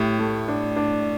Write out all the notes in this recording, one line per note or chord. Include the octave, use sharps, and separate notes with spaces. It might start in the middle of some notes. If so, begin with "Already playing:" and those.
Already playing: A2 G4
A3
D4
D4